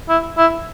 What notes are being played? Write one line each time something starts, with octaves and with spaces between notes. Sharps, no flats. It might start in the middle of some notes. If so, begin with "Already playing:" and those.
E4
E4